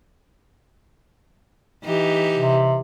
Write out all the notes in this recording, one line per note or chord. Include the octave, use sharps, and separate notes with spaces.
E3 D#4 G4
C3